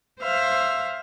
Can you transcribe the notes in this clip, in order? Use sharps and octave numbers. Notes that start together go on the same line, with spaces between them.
C5 E5 F5 F6